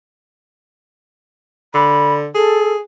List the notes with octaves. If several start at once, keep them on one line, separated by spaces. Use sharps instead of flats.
D3 B5
G#4 A4